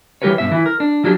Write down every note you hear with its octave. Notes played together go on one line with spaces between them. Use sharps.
E3 G3 G4 A#4 B4 C#5
G2 B2 E5
E3 E4
A#4
D4
F3 F#3 D4 G4